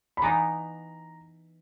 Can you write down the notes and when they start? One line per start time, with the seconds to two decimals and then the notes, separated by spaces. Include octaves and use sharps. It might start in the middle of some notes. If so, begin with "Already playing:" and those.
0.17 B5
0.22 E3 B3 D#4 A#5